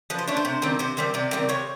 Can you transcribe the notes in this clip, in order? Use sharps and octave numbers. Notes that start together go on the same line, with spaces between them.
F3 B4
C5
A3 D4 C#5
C5
C3
D#3 G3 C4
C3 C5
D#3 G3 C4 C5
C3 D5
D#3 G3 C4
C3 C#5